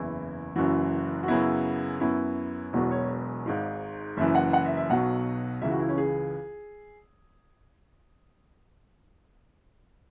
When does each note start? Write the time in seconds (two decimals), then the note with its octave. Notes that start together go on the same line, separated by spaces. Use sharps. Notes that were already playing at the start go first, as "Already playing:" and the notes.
Already playing: F#1 E2 E3 E4
0.56 F#1 F#2 E3 F#4
1.23 F#4
1.28 F#2 C#3 F#3 B3 E4
2.00 F#2 F#3 B3 E4
2.73 E1 E2 B2 F#3 F#4
2.91 C#5
3.46 G#1 G#2 G#3
4.17 F#1 F#2 E3 E5
4.35 F#5
4.53 F#5
4.66 E5
4.77 E5
4.89 B1 B2 F#3 F#5
5.61 C#2 C#3 E3 E5
5.71 F#4
5.80 E4
5.89 C#4
5.98 G#4